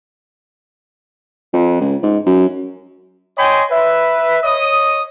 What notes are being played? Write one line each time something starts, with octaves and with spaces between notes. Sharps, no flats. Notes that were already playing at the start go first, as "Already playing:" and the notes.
F2
C#2
G#2
F#2
C#5 D#5 G5 G#5 C6
B4 E5
C#5 D#5 D#6